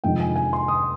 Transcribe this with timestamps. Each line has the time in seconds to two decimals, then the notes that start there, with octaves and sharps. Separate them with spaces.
0.04 F2 C3 D#3 G#3 D4 G5
0.20 G#5
0.36 G#5
0.53 C6
0.68 D#6